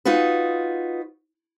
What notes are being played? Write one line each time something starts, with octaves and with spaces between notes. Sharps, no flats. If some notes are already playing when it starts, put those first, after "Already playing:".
D#4 F4 F#4 B4